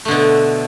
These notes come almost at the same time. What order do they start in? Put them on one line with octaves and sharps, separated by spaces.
A3 D3 B2